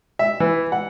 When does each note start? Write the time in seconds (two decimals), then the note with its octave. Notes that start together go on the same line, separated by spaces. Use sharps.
0.19 E5
0.40 E3
0.72 F#5